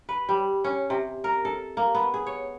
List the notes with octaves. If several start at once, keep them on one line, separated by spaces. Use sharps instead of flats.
B4
G3
C#4
C3
A#4
A4
A#3
B3
G#4
C#5